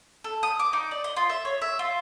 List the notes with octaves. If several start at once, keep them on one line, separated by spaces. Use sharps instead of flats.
A4
D#6
D6
D#4
D5
D#5
F4
E5
C#5
E5
F4